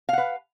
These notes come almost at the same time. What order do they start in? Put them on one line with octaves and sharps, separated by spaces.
F5 F#5 B4